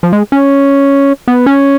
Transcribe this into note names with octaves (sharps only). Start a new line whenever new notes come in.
F3
G#3
C#4
B3
C#4